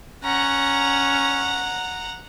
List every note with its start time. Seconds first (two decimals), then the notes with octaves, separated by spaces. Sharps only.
0.24 C#4 F#5 A#5